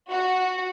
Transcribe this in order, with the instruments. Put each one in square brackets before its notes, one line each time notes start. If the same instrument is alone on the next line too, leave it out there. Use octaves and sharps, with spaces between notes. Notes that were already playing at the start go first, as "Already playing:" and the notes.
[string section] F#4